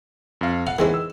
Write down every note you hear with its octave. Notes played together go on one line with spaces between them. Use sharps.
F2 F5
F5 F#5
D#3 E3 G#3 C4
E6